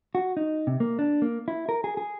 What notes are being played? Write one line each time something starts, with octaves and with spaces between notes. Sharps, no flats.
F#4
D#4
C3
A#3
D4
A#3
E4
A#4
G#4
G#4